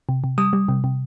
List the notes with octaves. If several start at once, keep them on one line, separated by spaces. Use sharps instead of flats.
C3
C3
G3 D#6
G3
C3
C3